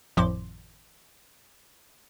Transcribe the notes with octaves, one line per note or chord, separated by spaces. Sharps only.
G#1 F2 A2 F3 C6 D6